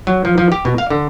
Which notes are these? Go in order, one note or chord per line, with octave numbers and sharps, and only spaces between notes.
F#3
F3
F3
G4
B2
F5
D3